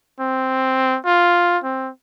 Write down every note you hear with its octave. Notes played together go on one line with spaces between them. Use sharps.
C4
F4
C4